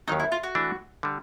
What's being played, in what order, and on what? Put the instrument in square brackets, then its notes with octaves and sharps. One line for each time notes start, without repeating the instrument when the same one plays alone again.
[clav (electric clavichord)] D#2 D#3 F#3 [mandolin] D#4
[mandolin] E4
F4
F#4
[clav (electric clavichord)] E3 A3 D4
D3 G3